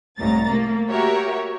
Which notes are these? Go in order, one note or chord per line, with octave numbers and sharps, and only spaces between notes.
C2 A2 A#5 A6
A3 A#3
F#4 G4 A#4 C#5 E5